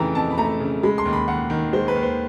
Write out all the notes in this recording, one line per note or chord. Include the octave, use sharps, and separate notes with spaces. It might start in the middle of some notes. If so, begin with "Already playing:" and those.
Already playing: F2 C#3 E3 A3 G5 A#5 B5
F2 A5
B5
A3 A#5
C#3
G#3 B5
C6
D#2
B5
D#2 F#5
D#3
G#3 C5
B4
D#2
C5